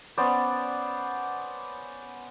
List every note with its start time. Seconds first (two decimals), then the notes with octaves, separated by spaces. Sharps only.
0.18 B3 C#4 C5 D5